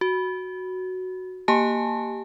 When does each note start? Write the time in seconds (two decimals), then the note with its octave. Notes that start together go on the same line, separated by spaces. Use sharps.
0.01 F#4
1.48 A#3 G4 G#5 A5